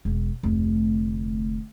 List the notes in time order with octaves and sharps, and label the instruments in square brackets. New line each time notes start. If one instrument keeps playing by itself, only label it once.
[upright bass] E1
F1 D2